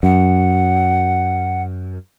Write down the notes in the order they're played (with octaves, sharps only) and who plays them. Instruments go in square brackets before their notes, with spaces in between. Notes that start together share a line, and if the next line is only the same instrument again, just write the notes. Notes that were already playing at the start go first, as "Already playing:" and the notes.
[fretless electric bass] F#2 [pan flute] F#5